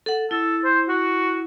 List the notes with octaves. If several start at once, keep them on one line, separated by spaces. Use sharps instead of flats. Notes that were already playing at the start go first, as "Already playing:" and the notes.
A4 F#5
E4 A4
C5
F#4